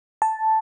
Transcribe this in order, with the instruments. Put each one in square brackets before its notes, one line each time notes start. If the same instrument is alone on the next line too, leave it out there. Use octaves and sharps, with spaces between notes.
[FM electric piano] A5